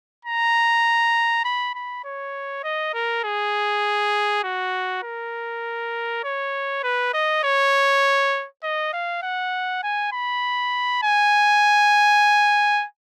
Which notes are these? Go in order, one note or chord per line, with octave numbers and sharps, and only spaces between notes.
A#5
B5
B5
C#5
D#5
A#4
G#4
F#4
A#4
C#5
B4
D#5
C#5
D#5
F5
F#5
G#5
B5
G#5